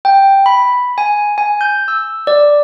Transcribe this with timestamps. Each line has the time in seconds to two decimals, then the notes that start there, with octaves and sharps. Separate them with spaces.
0.05 G5
0.46 B5
0.98 G#5
1.38 G#5
1.61 G6
1.88 E6
2.27 D5